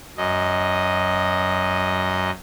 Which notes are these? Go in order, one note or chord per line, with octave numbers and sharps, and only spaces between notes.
F#2 D#5